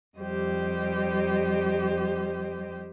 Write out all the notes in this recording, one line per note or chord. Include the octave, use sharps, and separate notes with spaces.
F2 G3 G4 C5 D#5